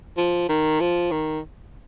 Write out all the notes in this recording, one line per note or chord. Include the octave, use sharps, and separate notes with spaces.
F3
D#3
F3
D#3